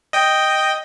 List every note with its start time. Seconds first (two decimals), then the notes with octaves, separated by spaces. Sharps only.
0.13 D#5 G5